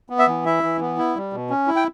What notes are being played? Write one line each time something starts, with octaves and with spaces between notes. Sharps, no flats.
B3
E5
E3
E4 E5
E3
B3
E4
G3
B2
C#4
E4
G5